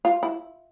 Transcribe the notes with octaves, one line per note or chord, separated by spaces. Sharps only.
F4
E4